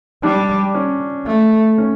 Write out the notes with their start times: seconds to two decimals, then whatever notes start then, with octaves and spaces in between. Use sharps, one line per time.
0.23 G3 D4
0.74 C#4
1.26 A3
1.78 C#4